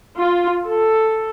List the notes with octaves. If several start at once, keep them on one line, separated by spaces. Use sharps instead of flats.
F4
A4